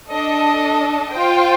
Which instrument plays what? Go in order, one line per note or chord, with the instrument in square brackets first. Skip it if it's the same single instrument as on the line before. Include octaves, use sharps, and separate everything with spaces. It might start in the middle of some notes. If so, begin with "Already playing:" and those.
[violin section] D4 A4 D#5 A5
F4 C5 G5